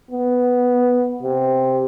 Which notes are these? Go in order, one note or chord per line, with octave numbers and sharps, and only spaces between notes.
B3
C3